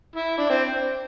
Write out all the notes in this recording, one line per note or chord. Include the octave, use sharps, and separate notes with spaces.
E4
D4
C4